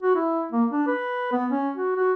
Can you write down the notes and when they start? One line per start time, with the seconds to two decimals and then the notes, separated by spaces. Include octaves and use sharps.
0.03 F#4
0.15 E4
0.52 A#3
0.71 D4
0.87 B4
1.32 B3
1.51 C#4
1.77 F#4
1.97 F#4